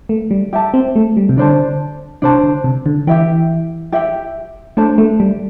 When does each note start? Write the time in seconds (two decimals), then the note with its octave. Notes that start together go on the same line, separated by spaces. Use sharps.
0.09 A3
0.31 G3
0.53 G4 E5 A5
0.74 C4
0.96 A3
1.17 G3
1.29 C3
1.37 D3 D4 C5 A5
2.22 C3 D4 C5 A5
2.43 D3
2.64 C3
2.86 D3
3.07 E3 G4 E5 G5
3.92 G4 E5 G5
4.77 A3 D4 C5 A5
4.98 A3
5.20 G3